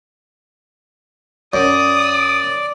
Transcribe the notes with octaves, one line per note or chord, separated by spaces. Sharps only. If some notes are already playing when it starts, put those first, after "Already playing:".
F#2 D5 D#6